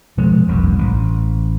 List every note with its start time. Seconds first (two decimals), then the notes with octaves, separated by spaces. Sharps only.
0.17 B2 F3 G#3 A3
0.47 F1 C2 G2 A#2
0.78 A1